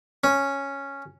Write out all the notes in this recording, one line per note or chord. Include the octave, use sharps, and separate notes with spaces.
C#4